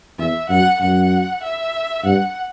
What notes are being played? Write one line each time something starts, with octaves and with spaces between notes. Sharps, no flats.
E2 E5
F#2 F#5
F#2 F#5
E5
G2 F#5